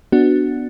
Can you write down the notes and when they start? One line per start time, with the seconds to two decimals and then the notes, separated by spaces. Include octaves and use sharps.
0.12 B3 D4 F#4